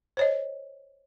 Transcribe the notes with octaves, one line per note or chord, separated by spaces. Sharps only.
C5 C#5 D#5